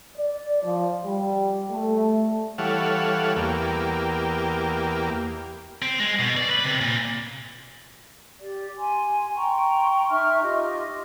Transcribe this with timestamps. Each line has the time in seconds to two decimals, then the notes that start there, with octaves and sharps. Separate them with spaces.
0.17 D5
0.63 F3
1.04 G3
1.71 A3
2.58 E3 G3 A4 C#5 F5 F#5
3.36 E2 A#3 G4
5.82 C4
6.00 G#3
6.19 B2
6.37 D5
6.50 B4
6.64 C3
6.81 A#2
8.40 G4 D5
8.76 G#5 C6
9.34 G5 A#5 C6 C#6
10.09 D#4 E5 C#6 F6
10.41 F4 G4 D#5